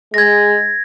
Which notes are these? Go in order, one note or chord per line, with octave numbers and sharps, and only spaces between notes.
G#3 G#6 A#6